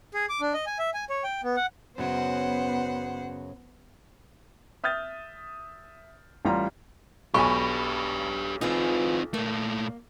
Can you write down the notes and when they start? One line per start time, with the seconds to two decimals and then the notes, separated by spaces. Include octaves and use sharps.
0.14 G#4
0.29 D6
0.41 D4
0.54 D#5
0.66 G#5
0.79 E5
0.94 G#5
1.10 C#5
1.24 G5
1.44 B3
1.56 F#5
1.98 F#2 C#3 F#3 B3 C5 F#5
4.84 E5 D#6 F6 G6 A6
6.45 A1 E3 G3 F4 A#5 C6
7.34 B1 G4 B4 G#5 B5 C#6
8.61 E3 C4 D#4 F4 G#4
9.34 A#2 A3 A#3